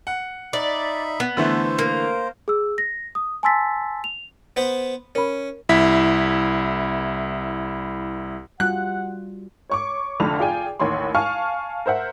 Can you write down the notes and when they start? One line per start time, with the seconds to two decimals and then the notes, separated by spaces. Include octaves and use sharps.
0.07 F#5
0.53 D#4 D5 E5 B5
1.20 B3
1.37 D3 E3 A3 C5
1.79 A#3
2.48 G#4 E6
2.78 A#6
3.15 D#6
3.43 G#5 A5 C6 E6 A6 B6
4.04 F7
4.56 B3 B4 C5
5.15 C#4 A#4 B5
5.69 C2 E4 B6
8.60 G3 F4 F#4 F#5 F#6
9.70 C#5 C#6 D6
10.20 F1 F2 D3 B5 F7
10.39 F4 G#4 D5 G5 G#5
10.80 A1 D#2 C#5 B5 C6
11.15 F5 G#5 A5 C#6 F6
11.86 A#4 C5 E5 F#5